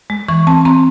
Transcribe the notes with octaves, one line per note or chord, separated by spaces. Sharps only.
G#3
E3 C#6
C4 A5
C4 A#5